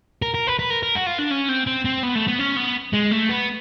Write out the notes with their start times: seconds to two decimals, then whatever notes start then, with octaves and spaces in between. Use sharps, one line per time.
0.22 A#4
0.34 A#4
0.47 B4
0.59 B4
0.70 A#4
0.83 A#4
0.95 F#4
1.07 F4
1.19 D4
1.31 C#4
1.49 C4
1.67 C4
1.85 C4
2.03 B3
2.15 A3
2.28 B3
2.39 C#4
2.57 B3
2.93 G#3
3.12 A3
3.29 B3